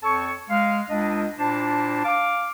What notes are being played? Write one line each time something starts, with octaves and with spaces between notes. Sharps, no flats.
F2 A4 C#5 A5 C#6
G#3 F5
C#2 D4 D#5
A#2 D4 E4 C5 A5
F5 D6